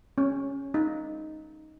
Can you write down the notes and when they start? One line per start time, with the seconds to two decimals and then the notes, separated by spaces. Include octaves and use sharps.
0.18 C#4
0.74 D#4